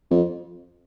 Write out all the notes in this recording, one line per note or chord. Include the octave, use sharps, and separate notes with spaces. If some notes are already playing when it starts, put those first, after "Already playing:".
F2